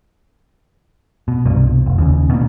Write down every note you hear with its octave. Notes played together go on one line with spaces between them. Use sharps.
B2
C2 G2 B2
F1
D#2 C#3
B2 A#3